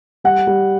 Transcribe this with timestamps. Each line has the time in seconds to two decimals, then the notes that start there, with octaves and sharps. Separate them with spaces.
0.24 G3 F#5
0.47 G3